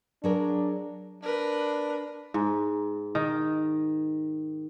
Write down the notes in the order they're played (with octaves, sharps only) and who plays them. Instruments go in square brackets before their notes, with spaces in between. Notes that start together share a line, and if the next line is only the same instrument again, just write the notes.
[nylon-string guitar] F#3 G#4 A#4 [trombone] D4
[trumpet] D4 [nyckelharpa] A#4 B4
[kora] G#2
D#3